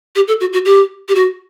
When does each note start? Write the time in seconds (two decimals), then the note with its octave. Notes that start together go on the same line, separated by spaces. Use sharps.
0.16 G4
0.28 A4
0.40 F#4
0.53 F#4
0.65 G4
1.09 G4
1.15 F#4